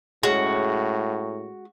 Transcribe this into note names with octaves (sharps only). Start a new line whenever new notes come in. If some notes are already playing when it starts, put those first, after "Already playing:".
A2 G#3 C#4 F#4